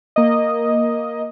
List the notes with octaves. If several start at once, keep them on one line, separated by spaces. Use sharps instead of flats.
A#3 D#5